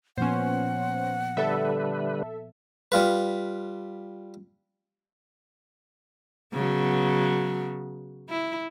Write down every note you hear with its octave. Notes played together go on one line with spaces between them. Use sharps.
A#2 F3 B3 C#4 C5 F#5
D3 G3 A4 B4 E5
G3 F4 B4
C#3 F#3 B3
E4